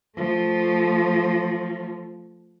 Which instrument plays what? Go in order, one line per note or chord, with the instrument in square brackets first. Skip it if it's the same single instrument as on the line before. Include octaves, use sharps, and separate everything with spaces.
[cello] F3 A3